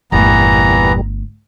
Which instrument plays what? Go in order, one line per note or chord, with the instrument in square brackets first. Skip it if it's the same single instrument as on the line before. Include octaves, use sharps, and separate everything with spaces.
[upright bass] G1 A3 [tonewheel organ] E2 A#2 G3 [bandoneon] E3 B3 A#5